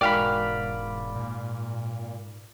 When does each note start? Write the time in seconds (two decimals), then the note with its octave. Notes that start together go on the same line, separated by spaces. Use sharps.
0.01 E1 G#2 F#4 A#4 D5 F5 G5 B5
1.16 A#2